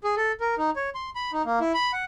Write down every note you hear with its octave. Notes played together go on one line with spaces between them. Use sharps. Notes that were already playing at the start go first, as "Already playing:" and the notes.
G#4
A4
A#4
D#4
C#5
C6
B5
D#4
A#3
E4
B5
F#5